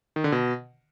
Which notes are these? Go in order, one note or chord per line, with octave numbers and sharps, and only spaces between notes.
D#3
D3
B2